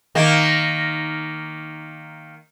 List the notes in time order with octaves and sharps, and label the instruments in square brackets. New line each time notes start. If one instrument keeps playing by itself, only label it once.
[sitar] D#3 A#3